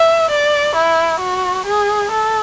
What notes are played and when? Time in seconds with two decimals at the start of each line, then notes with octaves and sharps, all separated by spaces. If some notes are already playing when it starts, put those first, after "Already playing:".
Already playing: E5
0.31 D5
0.76 E4
1.20 F#4
1.66 G#4
2.12 A4